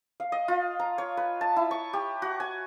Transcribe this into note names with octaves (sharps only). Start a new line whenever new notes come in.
F5
D#5
F4
A#5
C#5
B4
A5
E4
C#6
G4
F#4
G#5